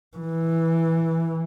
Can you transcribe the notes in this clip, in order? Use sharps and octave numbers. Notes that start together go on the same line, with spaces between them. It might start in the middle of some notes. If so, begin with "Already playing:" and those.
E3